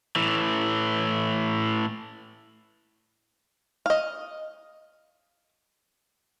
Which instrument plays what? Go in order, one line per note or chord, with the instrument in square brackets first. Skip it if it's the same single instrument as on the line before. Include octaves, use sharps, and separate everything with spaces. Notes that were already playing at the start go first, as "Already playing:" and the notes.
[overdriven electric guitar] A2 E3
[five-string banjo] D#5 F5